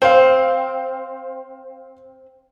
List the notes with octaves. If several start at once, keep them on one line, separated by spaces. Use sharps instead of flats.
C4 C5 F5